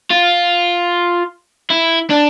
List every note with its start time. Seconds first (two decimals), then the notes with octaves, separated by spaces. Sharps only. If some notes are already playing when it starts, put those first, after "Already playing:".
0.10 F4
1.70 E4
2.11 D4